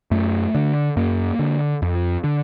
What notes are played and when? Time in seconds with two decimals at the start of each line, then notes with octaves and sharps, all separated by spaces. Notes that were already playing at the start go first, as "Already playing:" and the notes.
0.11 F#2 A3
0.55 D3
0.97 F#2 A#3
1.39 D3
1.82 F2
2.24 D3